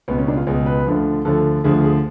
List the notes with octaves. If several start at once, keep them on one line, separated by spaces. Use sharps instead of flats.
C#2 B2 B3
C#4
D4
F4
C#2 B2 G#4
B4
D2 D3 F3
D2 D3 F3 A4
D2 D3 F3 G#4
G#4